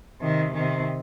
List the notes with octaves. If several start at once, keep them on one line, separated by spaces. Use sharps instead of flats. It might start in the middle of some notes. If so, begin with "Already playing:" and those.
C3 D#3
C3 D#3